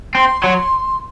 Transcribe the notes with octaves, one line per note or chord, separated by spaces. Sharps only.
C4 C6
F#3